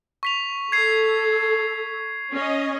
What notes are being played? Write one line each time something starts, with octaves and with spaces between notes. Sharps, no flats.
C#6 B6 F7
A4 G#6 C7
C#4 D#5